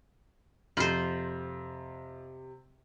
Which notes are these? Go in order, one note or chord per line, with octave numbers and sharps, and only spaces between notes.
F2 C3 F4 C5 F#7